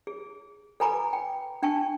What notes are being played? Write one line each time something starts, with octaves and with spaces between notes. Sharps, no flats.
G#4
A4 B4 G#5 A#5 B5 D6
G5
D4 G5 A5 C#6